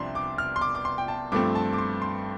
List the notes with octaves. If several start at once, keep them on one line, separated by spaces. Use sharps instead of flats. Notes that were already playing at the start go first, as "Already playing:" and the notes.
Already playing: C2 C3 F3 D4 C6
D6
F6
C6
D6
D6
C6
G5
A5
G2 F3 A3 C4 D6
A5
D6
C6
C6